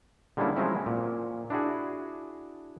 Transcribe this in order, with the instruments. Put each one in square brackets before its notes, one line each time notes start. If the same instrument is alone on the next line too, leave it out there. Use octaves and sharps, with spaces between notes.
[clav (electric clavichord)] D3 G3 G#3 A#3 C#4 E4
F3 F#3 G#3 C4 C#4 E4
A#2
D4 E4 F#4 G#4